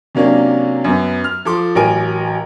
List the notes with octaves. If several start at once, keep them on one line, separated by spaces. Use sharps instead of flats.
C3 F#3 A#3 C#4 D4
F#2 B3
F6
F3 A4 C6 D6
A1 F#3 A#4 G#5 D7